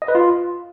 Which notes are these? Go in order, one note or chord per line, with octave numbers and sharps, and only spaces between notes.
D#5
B4
F4